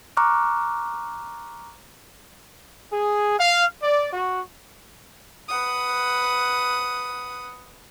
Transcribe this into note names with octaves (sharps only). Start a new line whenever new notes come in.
A#5 C#6 D6 F6 F#6
G#4
F5
D5
F#4
B4 F#5 D#6